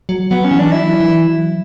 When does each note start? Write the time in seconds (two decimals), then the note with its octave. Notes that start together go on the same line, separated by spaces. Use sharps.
0.09 F#3
0.31 F#3 B3
0.44 C#4
0.51 E3
0.59 D4
0.72 F#3 E4
1.00 E3
1.27 F#3